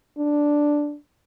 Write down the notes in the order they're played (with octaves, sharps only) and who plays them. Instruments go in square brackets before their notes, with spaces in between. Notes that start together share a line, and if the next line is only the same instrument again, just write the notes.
[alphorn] D4